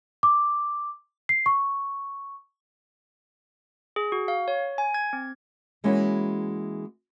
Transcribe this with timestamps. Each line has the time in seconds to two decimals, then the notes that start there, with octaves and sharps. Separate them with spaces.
0.23 D6
1.29 C7
1.46 C#6
3.96 G#4
4.12 F#4
4.28 F5
4.48 C#5
4.78 G#5
4.94 G#6
5.13 C4
5.84 E3 G#3 A#3 C#4 E4 F#4